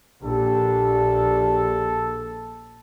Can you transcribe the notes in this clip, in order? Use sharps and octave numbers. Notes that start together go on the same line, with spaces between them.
A#1 D4 G4 A4